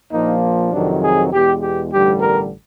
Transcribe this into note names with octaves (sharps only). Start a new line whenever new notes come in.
A#1 A#2 F3 A#3 D#4
F2 C3 D#3 F#3 D4
G#4
E2 B2 G#3 G4
G4
A1 G2 D3 G3 G4
A#4